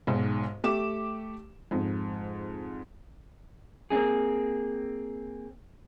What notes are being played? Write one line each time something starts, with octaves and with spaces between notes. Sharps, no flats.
B1 G#2
A3 G4 D6 E7
F2 G#2
A#3 C4 C#4 D#4 G#4